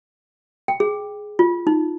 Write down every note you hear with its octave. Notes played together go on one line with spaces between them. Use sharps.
G5
G#4
F4
D#4